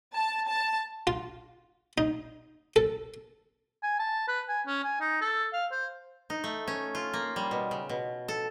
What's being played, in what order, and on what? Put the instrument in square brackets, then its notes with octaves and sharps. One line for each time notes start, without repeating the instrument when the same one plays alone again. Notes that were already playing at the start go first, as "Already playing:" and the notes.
[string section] A5
A5
[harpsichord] F4
D#4
A4
[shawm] G#5
A5
B4
G#5
C#4
G#5
D#4
A4
F5
C5
[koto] D#4
A3
C#4
F4
A#3
G3
B2
C#3
B2
A4